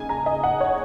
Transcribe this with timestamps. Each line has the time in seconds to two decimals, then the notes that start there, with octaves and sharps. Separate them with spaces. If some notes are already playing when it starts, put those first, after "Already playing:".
Already playing: C#3 A#3 D#4 G#5
0.09 A#5
0.26 D#5
0.44 F#5
0.60 C#5